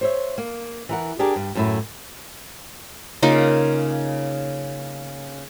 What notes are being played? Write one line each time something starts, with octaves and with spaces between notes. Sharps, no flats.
C5 C#5 E5
A#3
E3 A#4 F#5
D4 G4 G#4 A#4 D5
G2
F#2 A2 E4
C#3 A#3 D#4 F4